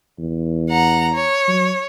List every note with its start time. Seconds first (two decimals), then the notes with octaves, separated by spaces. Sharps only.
0.19 E2
0.69 F#5 A#5
1.14 C#5
1.48 F#3